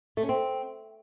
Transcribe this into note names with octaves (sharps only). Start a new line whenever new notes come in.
A3
C#4
C4